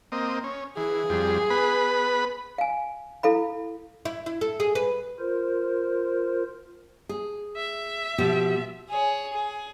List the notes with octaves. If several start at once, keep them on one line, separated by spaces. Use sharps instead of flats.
A#3 C4 D#5
C#4
E3 G#4
F2 G3
B3 B4 B5
F5 G#5
E4 A4 F5 B5
E4
E4
A4
G#4
B4
F4 A#4 C5
G#4
E5
B2 F3 G4
G#4 C#5
G#4